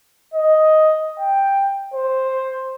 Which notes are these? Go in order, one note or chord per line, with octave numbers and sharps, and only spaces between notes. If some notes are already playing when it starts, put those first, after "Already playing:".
D#5
G5
C5